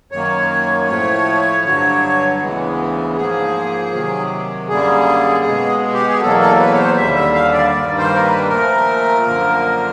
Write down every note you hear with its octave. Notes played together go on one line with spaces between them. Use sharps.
F#2 D#3 F#3 A#3 C#5
A2 F3 A3
G2 D3 F#3
D2 C#3 E3 G#3 B3
G#2 F3 A#3 G#4
C3 D#3 F#3
F#2 D3 G3 A#3 G#4
B2 G#3 B3
G4
G#4
E2 B2 F#3 A#3 A4
A4
B4
C#5
C5
D#2 D3 G3 E5
E5
F5
D5
G2 D#3 G3 A#3 D5
C5
A#4
B4
A#2 F3 A3 A#4
F#2 D3 F3 A#3